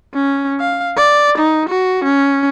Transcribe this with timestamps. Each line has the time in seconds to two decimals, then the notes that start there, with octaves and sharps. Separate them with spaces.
0.14 C#4
0.60 F5
0.97 D5
1.38 D#4
1.69 F#4
2.04 C#4